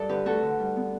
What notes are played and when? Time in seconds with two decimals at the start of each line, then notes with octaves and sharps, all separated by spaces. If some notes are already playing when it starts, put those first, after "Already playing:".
Already playing: G2 A4 D5
0.09 D3 G4 B4
0.25 A3 F#4 A4
0.43 D3
0.60 G3
0.76 B3